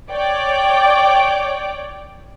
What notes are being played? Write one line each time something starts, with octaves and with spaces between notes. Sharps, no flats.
C#5 D5 G5 D6